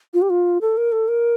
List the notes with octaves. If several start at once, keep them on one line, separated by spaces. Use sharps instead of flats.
F4
G4
F4
A4
A#4
A4
A#4